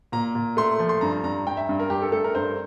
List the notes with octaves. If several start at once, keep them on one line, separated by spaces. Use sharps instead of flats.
A#2 A#5
A#2
A3 C6
F3
C6
G2 A#5
G2 A#5
G2 G5
E5
G2
A#4
G2 G4
A4
A3 A4
A#4
G2 C5